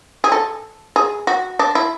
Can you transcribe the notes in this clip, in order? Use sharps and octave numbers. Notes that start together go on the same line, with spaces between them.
G#4
A4
G#4
F#4
D4
E4